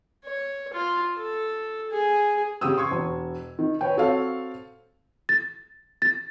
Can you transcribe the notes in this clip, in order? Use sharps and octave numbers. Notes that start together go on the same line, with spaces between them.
C#5
F4
A4
G#4
C#3 G4 D#6 E6
C6 C#6 G#6
E1
D#3
B4 C#5 G5
C4 F#4 A4 C#5 F5
A6
A6